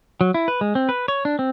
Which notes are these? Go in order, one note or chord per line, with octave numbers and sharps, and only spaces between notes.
F#3
E4
B4
G#3
C4
B4
C#5
D4
C4